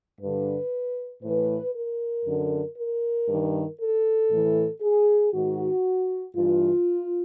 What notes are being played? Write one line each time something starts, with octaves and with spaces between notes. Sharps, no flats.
G2 D3 B4
A2 E3 B4
A#4
F#2 D3
A#4
G2 D#3
A4
A2 E3
G#4
G#2 D#3 F#4
G2 E3 F4